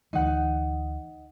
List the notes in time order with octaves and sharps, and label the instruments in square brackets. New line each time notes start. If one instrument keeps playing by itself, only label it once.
[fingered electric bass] D2 E3 A3 [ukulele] D#4 F#5